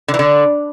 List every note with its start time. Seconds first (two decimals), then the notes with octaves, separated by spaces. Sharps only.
0.08 D3
0.14 E3
0.19 D3